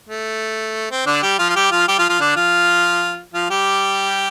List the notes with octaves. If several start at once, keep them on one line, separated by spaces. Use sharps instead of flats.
A3
C4
D3 D4
G3 G4
F3 F4
F4
G3 G4
F3 F4
G3 G4
F3 F4
F3 F4
D3 D4
F3 F4
F3 F4
G3 G4